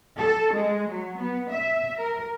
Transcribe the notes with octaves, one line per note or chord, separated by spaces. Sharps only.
A4
G#3
F#3
B3
E5
A#4